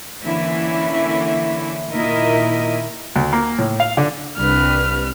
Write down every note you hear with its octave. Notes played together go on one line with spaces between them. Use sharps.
D3 E3 A#3 C#4 E4
A#2 D#3 E4 A#4 D#5
D2
A#3
A2
F5
D3
C2 D4 B4 F6